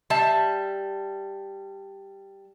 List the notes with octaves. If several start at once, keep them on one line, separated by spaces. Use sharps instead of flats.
G3 E5 A5